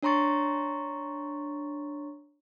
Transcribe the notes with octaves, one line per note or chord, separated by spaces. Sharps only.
D4 C#5 A#5 C6 C#6 A6